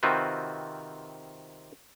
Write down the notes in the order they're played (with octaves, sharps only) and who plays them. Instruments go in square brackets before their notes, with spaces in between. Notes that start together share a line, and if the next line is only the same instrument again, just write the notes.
[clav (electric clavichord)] C3 D#3 C4 F4 F#4 B4